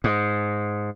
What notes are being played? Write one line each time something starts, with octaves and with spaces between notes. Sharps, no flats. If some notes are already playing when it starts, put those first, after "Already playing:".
G#2